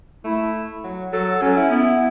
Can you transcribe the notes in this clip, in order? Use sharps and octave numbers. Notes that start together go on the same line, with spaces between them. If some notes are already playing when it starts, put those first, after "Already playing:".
A3 E4
F#3
F#3 A4
F#3 C#4
E4
B3 E4